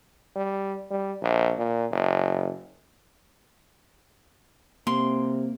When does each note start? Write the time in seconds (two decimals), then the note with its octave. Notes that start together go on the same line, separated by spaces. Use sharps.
0.36 G3
0.91 G3
1.22 A#1
1.58 A#2
1.92 F#1
4.87 C3 A#3 C6